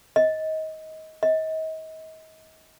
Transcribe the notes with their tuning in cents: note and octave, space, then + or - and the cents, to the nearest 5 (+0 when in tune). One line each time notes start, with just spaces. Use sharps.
D#5 +20
D#5 +35